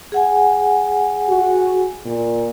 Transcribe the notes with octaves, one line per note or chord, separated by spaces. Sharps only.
G#4 F#5 G#5
F#4
A#2